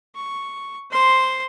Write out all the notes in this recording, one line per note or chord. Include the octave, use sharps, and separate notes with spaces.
C#6
C5 C6